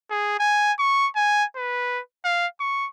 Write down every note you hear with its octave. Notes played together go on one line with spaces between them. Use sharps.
G#4
G#5
C#6
G#5
B4
F5
C#6